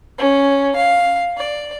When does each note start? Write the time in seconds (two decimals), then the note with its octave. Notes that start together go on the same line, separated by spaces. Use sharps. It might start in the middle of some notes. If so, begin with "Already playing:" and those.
0.18 C#4
0.76 F5
1.38 D5